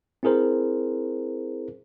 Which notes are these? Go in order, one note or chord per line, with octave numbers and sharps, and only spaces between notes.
C4 E4 G#4 A#4 C5